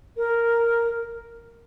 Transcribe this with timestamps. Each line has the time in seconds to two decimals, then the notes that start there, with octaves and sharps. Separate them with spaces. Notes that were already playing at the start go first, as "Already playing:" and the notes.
0.17 A#4